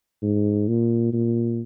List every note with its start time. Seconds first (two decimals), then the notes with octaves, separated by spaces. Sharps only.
0.22 G#2
0.68 A#2
1.13 A#2